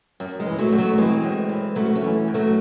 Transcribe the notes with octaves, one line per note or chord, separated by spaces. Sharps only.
F#2
G#3
E3
F#3 A3
F#2
F#3 A3
E3 G#3 C4
F#2
E3
F#2 F#3 A3
A3 C#4
E3
F#2
F#3 A3